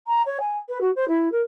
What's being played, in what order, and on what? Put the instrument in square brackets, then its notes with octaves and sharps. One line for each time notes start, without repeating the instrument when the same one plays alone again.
[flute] A#5
C#5
G#5
B4
F#4
C5
E4
A#4